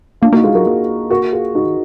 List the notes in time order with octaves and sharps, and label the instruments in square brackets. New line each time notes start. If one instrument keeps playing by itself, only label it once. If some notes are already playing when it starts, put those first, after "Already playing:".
[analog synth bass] A#3 [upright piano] D4 F4
[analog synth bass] A#3 [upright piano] D#4 F#4
[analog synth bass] G#3 [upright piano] F4 G#4
[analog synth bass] F#3 [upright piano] F#4 A#4
[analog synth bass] A#3 [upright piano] F4 G#4
[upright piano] F#4 A#4
F4 G#4
[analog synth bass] G#3 [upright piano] D#4 F#4
[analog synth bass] D#3